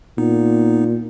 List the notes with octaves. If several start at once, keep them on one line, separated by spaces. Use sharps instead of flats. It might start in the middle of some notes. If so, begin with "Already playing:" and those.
A#2 B3 D#4